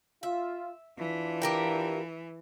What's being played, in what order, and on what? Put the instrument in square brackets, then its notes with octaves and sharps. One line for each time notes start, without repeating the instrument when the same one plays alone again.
[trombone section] F4 [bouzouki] E5
[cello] E3 [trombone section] D4 F4
[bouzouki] G4 A#4 G5